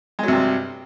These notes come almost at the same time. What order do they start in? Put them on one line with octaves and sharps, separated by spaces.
G#3 F#3 C3 G2